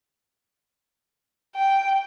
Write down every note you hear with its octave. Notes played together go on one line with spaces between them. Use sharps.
G5